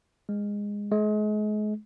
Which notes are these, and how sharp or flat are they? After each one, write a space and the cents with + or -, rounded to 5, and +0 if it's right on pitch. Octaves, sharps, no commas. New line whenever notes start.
G#3 -15
G#3 +35